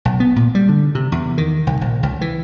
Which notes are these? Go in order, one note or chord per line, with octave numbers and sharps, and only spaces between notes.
B1
B3
A#2
G3
D3
C3
E2
D#3
C2
A#1
C#2
E3